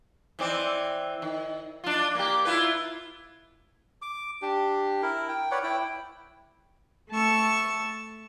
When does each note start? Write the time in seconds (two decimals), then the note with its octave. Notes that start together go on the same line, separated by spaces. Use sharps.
0.39 E3 C4 D5
1.22 D#3
1.84 D4 F4
2.15 A#3 G4
2.45 E4 F4 B4
4.02 D6
4.42 D4 G4
5.02 E4 A#4
5.29 G5
5.51 B4 C#5 D5 F#5
5.63 E4 G5
7.11 A3 A5 C#6 E6